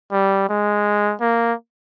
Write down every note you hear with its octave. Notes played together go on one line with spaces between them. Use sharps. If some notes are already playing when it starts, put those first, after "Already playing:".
G3
G#3
A#3